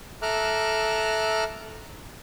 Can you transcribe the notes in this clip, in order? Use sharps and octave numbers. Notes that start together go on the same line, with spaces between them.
A4 E5 A#5 D6 F6 F#6